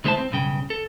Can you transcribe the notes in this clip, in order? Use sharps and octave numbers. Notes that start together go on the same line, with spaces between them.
D2 G#3 C4 E4 C5 A5
C4
B1 G2 C#3 G5
A4